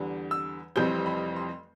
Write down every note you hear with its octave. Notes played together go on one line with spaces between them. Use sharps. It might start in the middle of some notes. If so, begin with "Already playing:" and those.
Already playing: E2 D3 G3
E6
F1 F2 E3 G3 C4 G6
B5
C6